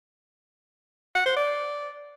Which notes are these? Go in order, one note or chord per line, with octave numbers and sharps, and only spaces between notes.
F#5
C5
D5